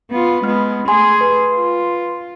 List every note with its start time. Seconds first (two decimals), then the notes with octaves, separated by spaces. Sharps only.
0.11 B3 F4
0.44 G#3 B3 F6
0.88 A3 G#4 G#5 C6
1.21 B4 C6
1.55 F4